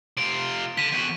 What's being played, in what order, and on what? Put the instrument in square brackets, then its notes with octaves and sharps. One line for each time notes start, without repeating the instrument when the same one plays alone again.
[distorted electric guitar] C3 F4 [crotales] D7
[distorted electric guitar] D3 [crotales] B6 D#7
[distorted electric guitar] E2 F#4